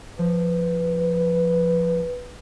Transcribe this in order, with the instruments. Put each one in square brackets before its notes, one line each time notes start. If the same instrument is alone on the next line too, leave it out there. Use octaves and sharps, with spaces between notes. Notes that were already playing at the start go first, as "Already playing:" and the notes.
[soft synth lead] F3 [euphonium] B4